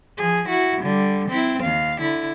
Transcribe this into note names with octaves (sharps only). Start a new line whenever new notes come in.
F3 G#4
E4 F#4
D3 G3
C4 E4
D#2 F5
D3 E4